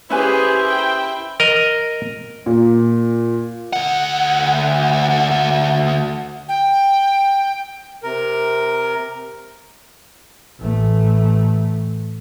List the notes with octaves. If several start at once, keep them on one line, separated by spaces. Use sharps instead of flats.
C#4 E4 G4 G#4 B4 C5 G#5
G5
A#4 D#5
A#2
D2 F#5
G5
C3 A#4
A1 A3